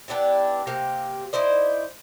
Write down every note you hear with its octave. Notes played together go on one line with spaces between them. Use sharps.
B3 D4 E4 G4
C3 A#3 G4 F5
D#4 E4 C5 D5